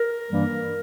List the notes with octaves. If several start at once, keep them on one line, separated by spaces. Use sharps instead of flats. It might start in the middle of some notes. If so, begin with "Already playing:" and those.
Already playing: A#4
G2 E3 G3 A#3